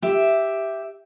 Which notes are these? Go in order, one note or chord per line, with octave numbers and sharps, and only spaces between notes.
G4 E5